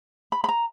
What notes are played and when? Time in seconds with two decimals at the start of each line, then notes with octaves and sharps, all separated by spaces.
0.32 B5
0.44 B5
0.49 A#5